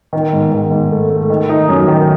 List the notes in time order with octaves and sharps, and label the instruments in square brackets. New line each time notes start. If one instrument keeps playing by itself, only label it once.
[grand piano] D#3
G#2
D#3
G#2
A3
A3
D#3
D#4
F#2
D#3